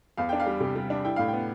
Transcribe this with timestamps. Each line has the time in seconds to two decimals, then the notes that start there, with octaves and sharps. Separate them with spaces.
0.17 E2 F5
0.29 D4 G5
0.40 F5
0.46 G3
0.60 C3
0.76 G3
0.90 D4
1.05 E4 G5
1.16 A2 F5
1.28 B3 G5